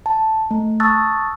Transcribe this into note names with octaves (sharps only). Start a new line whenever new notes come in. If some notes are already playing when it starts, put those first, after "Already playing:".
A5
A3
A5 C#6 D#6 E6 F#6 A6